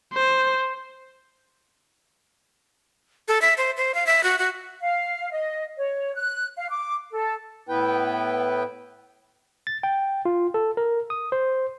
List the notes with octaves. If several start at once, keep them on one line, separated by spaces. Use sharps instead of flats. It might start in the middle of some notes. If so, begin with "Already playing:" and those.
C5
A4
E5
C5
C5
F5
E5
F#4
F#4
F5
D#5
C#5
F#6
F5
D6
A4
A2 B3 E4 B4 G5
A6
G5
F4
A4
A#4
D#6
C5